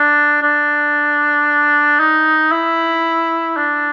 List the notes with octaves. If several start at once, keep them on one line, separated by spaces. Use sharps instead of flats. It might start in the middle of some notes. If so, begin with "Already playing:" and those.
Already playing: D4
D4
D#4
E4
D4